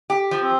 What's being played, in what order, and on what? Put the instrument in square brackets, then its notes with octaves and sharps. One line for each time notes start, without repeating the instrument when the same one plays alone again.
[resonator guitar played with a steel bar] G4
F3
[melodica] C4